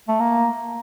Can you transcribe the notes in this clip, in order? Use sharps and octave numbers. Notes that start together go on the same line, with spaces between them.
A3
A#3